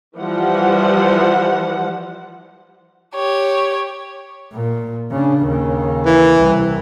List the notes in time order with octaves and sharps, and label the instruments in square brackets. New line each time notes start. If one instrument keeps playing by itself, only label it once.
[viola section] E3 F3 G3 F#5
[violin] G4 C#5
[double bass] A#2
C#3 D4
D#2 C#3
[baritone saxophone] E3
[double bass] C2